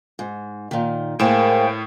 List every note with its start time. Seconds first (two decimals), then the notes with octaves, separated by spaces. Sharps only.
0.19 G#2
0.71 A#2 D#3
1.19 A2 G#3 A#3 A#4 C5 G5 E7